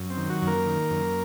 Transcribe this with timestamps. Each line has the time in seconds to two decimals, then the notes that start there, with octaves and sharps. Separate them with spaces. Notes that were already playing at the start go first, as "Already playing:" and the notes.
Already playing: F#2
0.10 C4
0.17 D#3
0.29 F#3 F#4
0.42 F#2
0.47 A#3 A#4
0.66 D#3
0.90 F#2